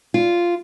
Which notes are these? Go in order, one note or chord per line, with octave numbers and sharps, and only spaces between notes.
F4